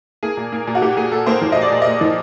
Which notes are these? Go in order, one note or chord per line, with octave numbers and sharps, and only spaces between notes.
A#3 G#4
A#2
A#3
A#2
F#4
A#2 G4
A#2 G#4
A#2 A4
A#3 C5
F3
A#2 D#5
D5
A#2
D#5
A#2
F3